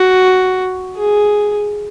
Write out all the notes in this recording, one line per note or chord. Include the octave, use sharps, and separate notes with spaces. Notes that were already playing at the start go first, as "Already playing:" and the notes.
Already playing: F#4
G#4